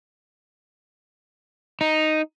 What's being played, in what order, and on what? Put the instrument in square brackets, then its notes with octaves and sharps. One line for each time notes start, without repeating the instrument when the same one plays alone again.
[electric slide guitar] D#4